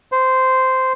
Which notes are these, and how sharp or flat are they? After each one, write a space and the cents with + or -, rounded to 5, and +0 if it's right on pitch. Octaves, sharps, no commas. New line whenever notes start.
C5 -10